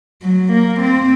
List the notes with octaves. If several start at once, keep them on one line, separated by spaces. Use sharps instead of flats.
F#3
A#3
C4